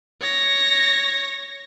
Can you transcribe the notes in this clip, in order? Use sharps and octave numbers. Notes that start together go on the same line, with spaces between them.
C#5 A#6